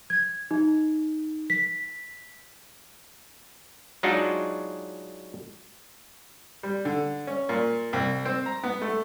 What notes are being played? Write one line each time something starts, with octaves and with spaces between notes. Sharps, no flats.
G#6
D#4
B6
F#3 G#3 D4 D#4 F4 F#4
G3
D3
C#4
A#2
C2
C4
A#5
B3
A3